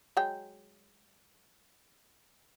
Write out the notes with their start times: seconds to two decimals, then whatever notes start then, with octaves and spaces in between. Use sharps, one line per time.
0.17 F#3 G#3 G5